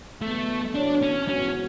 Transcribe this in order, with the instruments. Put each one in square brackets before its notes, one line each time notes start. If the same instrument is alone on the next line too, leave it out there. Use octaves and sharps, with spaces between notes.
[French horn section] E2 D3 F#3 B3 D4 [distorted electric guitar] A3
[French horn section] A2 E3 B3 F#4 C#5 [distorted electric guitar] D4
[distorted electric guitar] C#4
[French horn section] G#2 E3 B3 F#4 [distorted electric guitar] C#4